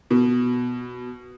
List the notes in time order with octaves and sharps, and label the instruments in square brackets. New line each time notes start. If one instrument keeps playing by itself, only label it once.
[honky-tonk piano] B2